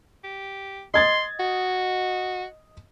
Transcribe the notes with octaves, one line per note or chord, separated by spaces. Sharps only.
G4
D#5 C6 G#6 A6
F#4